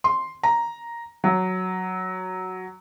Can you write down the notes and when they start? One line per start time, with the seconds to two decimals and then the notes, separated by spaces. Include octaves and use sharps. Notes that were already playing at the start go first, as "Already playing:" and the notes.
0.04 C6
0.43 A#5
1.24 F#3